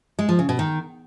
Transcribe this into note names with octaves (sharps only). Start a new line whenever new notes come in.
G#3
F3
C#3
B2
D#3